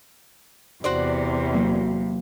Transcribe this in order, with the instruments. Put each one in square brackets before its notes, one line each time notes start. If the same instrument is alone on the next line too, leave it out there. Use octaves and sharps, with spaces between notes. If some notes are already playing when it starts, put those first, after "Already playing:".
[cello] E2 C3 [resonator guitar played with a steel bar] F#4 C5 D5
[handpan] F#3 A#3